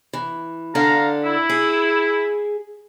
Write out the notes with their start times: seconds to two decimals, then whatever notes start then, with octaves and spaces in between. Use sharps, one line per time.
0.13 E3
0.75 D3 D4 A4 F5 A#5
1.24 E4
1.49 G#4